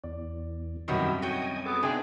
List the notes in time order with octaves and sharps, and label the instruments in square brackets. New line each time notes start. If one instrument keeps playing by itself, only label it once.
[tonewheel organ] E2 [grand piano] D5
[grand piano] C2 F#2 [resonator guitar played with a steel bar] D#3 F#3 B3 [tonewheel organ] G4 A#4 E5
[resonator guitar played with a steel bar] F#4 C#5 G5 [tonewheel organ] D#5 G#5
[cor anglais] B3 [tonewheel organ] G#4 A4 D6
[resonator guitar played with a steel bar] C3 D4 G5 [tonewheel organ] B3 D#4 [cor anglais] G#4